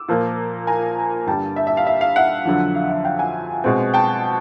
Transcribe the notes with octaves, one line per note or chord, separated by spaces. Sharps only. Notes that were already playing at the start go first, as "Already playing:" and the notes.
Already playing: D6 E6
A#2 F3 A#3
G#5 A#5
G2 D3 G3 G5 A5
E5
E5
F5
E5
F5
E5 F#5
F2 D3 F#3
F5
E5 F#5
F5 G5
F#5 G#5
B2 G#3 C4
G5 A5